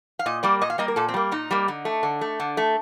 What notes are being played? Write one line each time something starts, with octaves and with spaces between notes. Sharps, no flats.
F5
A#2 D#5
G3 A#3 D5
A#2 D#5
F5
G3 A#3 D#5
A#4
A#2 A4
C4
G3 A#3
A#2 D#4
G3 A#3
D3
A3
D3
A3
D3
A3